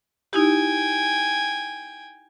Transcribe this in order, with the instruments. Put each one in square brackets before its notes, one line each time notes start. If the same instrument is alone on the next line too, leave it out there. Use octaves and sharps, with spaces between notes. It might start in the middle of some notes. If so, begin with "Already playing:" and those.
[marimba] D#4 E4 G4 [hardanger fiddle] G5 G#5